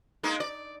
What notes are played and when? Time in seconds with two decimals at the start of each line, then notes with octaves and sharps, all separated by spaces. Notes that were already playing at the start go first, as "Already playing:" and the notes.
0.23 G#3 A#3 D#4
0.40 D5